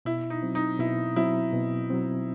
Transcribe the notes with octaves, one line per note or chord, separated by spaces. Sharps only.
B2 E4
D#4
F#3 C4
D#4
B2 E4
F#3 C4 E4
B2
F#3 C4